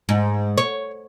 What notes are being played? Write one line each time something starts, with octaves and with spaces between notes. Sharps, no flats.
G#2
C#5